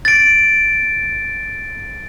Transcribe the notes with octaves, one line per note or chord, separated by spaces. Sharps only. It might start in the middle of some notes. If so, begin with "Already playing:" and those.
A6 D7